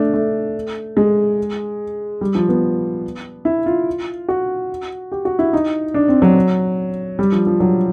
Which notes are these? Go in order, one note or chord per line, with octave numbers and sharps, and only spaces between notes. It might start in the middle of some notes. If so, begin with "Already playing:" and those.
Already playing: A3 D4
A3
G#3
G3
F3
B3
E4
F4
F#4
G4
F#4
E4
D#4
D4
C4
F#3
G3
F3
F3
F#3